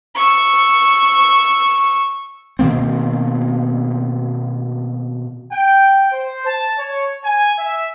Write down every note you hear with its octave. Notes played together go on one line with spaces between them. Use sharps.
C#6 E6
B2 D#3 A#3 C4
G5
C5
A5
C#5
G#5
E5